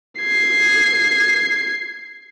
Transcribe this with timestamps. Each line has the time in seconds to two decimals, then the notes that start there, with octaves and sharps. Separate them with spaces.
0.20 G#6 C7